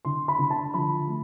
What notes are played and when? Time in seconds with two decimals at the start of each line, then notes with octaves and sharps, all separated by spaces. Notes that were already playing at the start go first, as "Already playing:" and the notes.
0.05 D3 C6
0.28 B5
0.39 D3
0.50 A5
0.74 F3 B5
1.08 A3